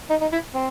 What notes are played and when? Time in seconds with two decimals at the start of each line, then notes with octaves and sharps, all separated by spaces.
0.10 D#4
0.21 D#4
0.32 E4
0.55 C4